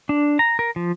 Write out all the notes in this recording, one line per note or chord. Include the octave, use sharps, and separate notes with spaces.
D4
A#5
A#4
F3